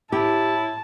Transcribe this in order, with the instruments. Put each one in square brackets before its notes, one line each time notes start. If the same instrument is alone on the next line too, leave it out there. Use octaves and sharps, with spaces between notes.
[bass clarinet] A2 [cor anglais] E4 [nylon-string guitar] G4 [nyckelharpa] A5